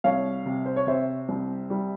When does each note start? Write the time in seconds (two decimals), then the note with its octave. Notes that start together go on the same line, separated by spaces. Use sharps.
0.04 C2 C#5 F5
0.46 C3
0.66 C5
0.76 C#5
0.87 C3 C5 E5
1.29 C2
1.70 G3